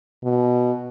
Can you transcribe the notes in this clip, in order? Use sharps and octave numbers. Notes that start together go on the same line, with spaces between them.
B2